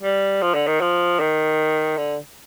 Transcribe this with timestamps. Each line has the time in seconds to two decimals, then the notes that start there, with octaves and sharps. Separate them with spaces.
0.02 G3
0.42 F3
0.54 D3
0.67 D#3
0.81 F3
1.20 D#3
1.97 D3